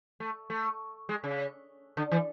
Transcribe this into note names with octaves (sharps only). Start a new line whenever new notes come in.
A3
A3
G#3
C#3
D3
E3